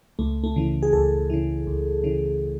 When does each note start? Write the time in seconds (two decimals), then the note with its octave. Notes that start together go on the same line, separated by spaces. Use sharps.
0.19 C#2 A3
0.44 A3
0.56 C#3 E3
0.83 G#4
0.93 C#2 A4
1.30 C#3 E3
1.67 C#2
2.04 C#3 E3